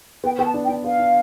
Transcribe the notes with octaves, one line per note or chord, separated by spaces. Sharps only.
B3 G5
B3 G5
A5
D4
G5
D4
B3 F5
D4